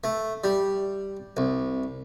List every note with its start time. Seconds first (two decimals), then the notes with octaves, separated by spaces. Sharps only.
0.04 A3
0.44 G3
1.37 C2